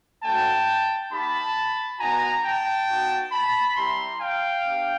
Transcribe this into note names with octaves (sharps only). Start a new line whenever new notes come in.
A3 C#4 F#4 G5 A5
A#3 D#4 G4 A5 B5
B3 D#4 F#4 G#5 A#5
G5 A5
B3 D#4 F#4
A5 B5
G3 C4 E4 G4 A#5 C6
F5 G5
B3 D4 G4